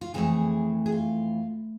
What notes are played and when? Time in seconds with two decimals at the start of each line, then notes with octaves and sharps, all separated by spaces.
0.01 F4
0.14 F2 E3 A3 G#4
0.86 G#4
0.92 F4